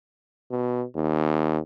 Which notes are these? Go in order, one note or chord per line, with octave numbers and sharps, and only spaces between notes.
B2
D#2